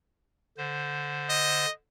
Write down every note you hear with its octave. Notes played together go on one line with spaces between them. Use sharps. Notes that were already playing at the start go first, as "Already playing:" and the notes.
D3 C5
D#5